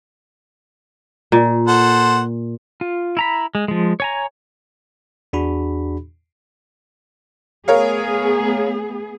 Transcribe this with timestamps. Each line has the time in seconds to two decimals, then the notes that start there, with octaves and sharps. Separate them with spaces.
1.32 A#2
1.68 A4 C5 F#5
2.81 F4
3.17 E4 A#5 B5
3.55 G#3
3.68 F3 G#3
4.00 C#5 G#5 A#5
5.33 E2 D4 F#4 G#4 B5
7.68 A3 B3 G#4 A#4 C#5 F5